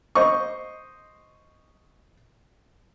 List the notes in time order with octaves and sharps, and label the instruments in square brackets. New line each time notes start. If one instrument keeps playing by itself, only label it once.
[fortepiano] C5 D#5 C#6